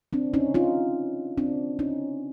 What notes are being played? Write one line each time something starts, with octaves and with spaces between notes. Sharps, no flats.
C4 D4
C#4 D#4
D#4 F4
C4 D4
C#4 D#4